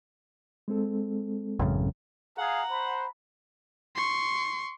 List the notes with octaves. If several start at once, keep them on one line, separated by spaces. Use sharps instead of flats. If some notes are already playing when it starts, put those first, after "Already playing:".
G#3 C4 A4
A1 F#2 C#3
G#4 F5 F#5 A#5
C5 B5
C6 C#6